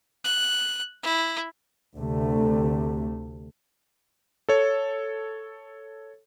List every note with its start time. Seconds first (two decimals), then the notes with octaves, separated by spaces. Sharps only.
0.24 F#6
1.03 E4
1.96 D2 C3 A3
4.49 A4 C#5